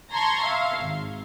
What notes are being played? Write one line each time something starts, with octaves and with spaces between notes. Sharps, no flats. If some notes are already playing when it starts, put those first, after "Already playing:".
A5 A#5 C6 C#6 G#6 A#6
E5 F5
G#1